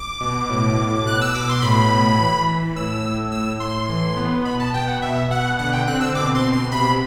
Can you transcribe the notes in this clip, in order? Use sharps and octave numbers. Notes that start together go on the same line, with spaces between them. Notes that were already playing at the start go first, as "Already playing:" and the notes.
Already playing: D6
B2
A2
A2
B2 F#6
E6
B2 D6
C6
A2 B5
A2
E3
E3
A2 E6
A2
A2 E6
A2 C6
E3
B3
B2 B5
A5
B2 G5
F#5
B2 E5
B2 F#5
D3 F#5
G5
C4 F#6
E6
B2 D6
C6
B2
C6
C3 B5